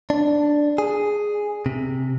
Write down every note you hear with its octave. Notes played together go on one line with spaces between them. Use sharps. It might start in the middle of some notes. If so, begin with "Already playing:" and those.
D4
G#4
C3